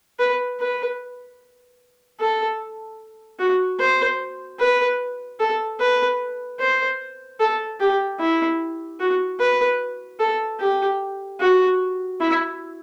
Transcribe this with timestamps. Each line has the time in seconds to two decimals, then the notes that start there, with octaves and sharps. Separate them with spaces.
0.19 B4
0.60 B4
2.19 A4
3.39 F#4
3.79 C5
4.59 B4
5.39 A4
5.80 B4
6.60 C5
7.40 A4
7.80 G4
8.19 E4
9.00 F#4
9.39 B4
10.19 A4
10.60 G4
11.40 F#4
12.20 E4